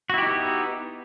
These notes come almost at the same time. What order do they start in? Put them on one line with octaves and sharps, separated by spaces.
F#4 E4 G4 D#4 B3